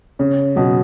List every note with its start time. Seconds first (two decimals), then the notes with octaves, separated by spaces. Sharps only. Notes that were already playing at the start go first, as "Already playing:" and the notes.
0.19 C#3 C#4
0.56 B2 F#3